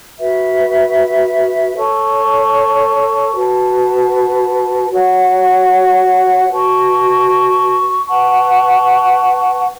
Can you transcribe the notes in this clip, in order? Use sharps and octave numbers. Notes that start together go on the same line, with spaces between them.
F#4 B4 E5
A4 C#5 A5 C#6
F#4 B4 A5
F#4 C#5 F#5
F#4 B4 A5 C#6
B4 F#5 A5 C#6